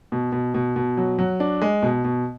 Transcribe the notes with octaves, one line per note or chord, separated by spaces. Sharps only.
B2
B2
B2
B2
F#3
F#3
D4
G#3
B2
B2